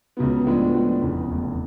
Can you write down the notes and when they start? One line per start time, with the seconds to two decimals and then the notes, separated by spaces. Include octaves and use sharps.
0.17 C#2 C#3 F#3 B3
0.45 A2 F3 G#3 B3 D4
0.74 A2 F3 G#3 B3 D4
1.02 F1 E2 C#3 E3
1.30 F1 E2 C#3 E3